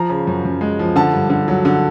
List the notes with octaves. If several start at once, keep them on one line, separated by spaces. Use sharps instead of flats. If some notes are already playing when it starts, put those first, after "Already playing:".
Already playing: F3 A#5
C#3
F#2
F#2
G#3
F3
D3 A5
G2
D3
F#3
D3